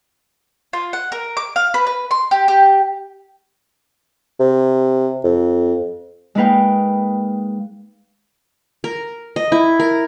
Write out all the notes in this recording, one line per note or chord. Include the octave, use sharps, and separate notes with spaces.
F4
F#5
A#4
D6
F5
B4
B4
C6
G4
G4
C3
F2
G#3 A#3 D#4 B4 F5 G5
A#4
D#5
E4
A#4